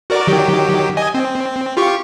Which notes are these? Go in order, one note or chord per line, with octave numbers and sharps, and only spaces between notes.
F#4 A#4 D5
D#3 F#3 G4
D#5 G#5
C4
F4 G4 C#6